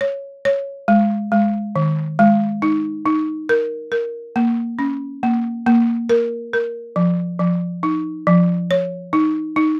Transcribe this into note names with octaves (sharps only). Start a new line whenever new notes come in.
C#5
C#5
G#3
G#3
D#3
G#3
D#4
D#4
A#4
A#4
A#3
C#4
A#3
A#3
A#4
A#4
F3
F3
D#4
F3
C#5
D#4
D#4